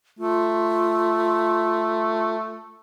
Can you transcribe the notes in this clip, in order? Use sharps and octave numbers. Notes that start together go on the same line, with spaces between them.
A3 F4